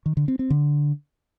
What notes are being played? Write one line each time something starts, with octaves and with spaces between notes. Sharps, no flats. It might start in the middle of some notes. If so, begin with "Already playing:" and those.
D#3
D3
C4
C4
D3